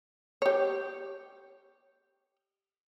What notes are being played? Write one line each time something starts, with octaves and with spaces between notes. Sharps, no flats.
G4 C#5